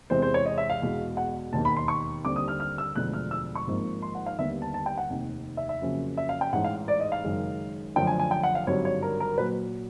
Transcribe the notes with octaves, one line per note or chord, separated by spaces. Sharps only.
E2 C3 E3 G#3 C4 C5
C5
C#5
D#5
E5
F5
E2 B2 G#3
F#5
E1 D#2 D#3 A5
B5
C6
C#6
D#2 D3 G3 C4 D6
D#6
F6
F6
E6
E1 D2 D3 F3 G#3 F#6
F6
E6
C#6
G#1 G#2 F3 A#3
C6
F#5
F5
D#2 D3 G3 B3 E5
A5
A5
G5
F#5
F1 D#2 D#3
E5
E5
F2 C#3 F#3 A#3 C#4
E5
F5
G5
A1 G#2 E3 F#5
F5
D5
D#5
F5
F#1 F#2 D#3 G#3
F#2 D3 F3 A3 G5
G#5
G#5
G5
F#5
F5
G#1 G2 D3 F#3 C#5
C#5
A#4
A#4
A#2 F#3 B4